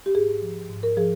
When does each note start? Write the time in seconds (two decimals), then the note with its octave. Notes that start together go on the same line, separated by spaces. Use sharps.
0.06 G4
0.15 G#2 G#4
0.42 F3
0.70 G#2
0.83 A#4
0.97 F3 G#4